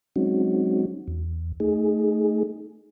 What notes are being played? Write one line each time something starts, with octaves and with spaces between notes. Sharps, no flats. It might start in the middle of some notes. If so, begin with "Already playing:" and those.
F#3 G#3 C4 C#4 D#4 F#4
E2
A3 D#4 G#4